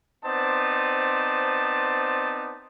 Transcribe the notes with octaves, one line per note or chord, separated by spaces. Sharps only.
B3 C4 D#4 C5 D5 A5